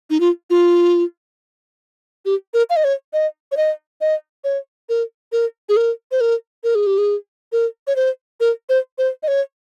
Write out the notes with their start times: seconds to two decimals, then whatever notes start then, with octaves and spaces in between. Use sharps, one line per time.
0.10 D#4
0.20 F4
0.50 F4
2.25 G4
2.54 A#4
2.70 F5
2.76 D#5
2.84 C#5
3.13 D#5
3.52 C#5
3.57 D#5
4.01 D#5
4.44 C#5
4.89 A#4
5.32 A#4
5.69 G#4
5.77 A#4
6.12 C5
6.21 A#4
6.64 A#4
6.75 G#4
6.87 G4
6.98 G#4
7.52 A#4
7.87 C#5
7.96 C5
8.40 A#4
8.69 C5
8.98 C5
9.23 D#5
9.28 C#5